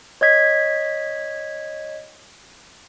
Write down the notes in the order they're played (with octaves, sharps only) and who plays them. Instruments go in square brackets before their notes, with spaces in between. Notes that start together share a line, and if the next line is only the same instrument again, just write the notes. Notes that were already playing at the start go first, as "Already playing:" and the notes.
[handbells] C#5 D#5 G#6 B6